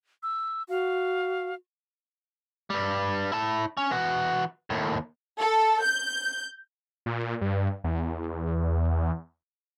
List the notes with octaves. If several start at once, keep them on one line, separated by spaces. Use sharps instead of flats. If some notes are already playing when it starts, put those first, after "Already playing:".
E6
F#4 F5
G2 G3
E4 A5
C#4
E3 F#4
D#2 A2
A4
G6
A#2
G2
E2